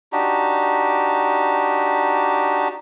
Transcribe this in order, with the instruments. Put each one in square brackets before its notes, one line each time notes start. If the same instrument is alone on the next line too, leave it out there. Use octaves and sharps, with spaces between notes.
[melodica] D4 D#4 F#4 G4